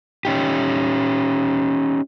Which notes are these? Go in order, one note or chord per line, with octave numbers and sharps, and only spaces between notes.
C#4 D#4 G4